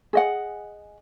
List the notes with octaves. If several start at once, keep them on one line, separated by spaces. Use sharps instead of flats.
G#4 D#5 F#5